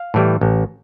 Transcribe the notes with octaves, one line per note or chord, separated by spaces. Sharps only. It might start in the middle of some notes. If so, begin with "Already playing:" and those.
Already playing: F5
A2 E3 G3
A1